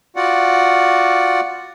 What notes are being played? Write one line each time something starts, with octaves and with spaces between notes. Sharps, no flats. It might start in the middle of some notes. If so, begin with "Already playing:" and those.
F4 F#4 D5 F#5